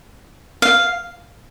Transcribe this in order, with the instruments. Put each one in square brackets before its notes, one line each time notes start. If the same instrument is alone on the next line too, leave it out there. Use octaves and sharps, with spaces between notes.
[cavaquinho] F5